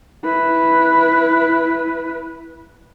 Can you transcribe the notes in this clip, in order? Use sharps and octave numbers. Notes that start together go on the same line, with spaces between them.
E4 B4